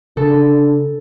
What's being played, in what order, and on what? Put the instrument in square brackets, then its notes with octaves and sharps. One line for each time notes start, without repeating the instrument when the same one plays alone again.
[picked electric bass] C#3 [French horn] D4 [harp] A4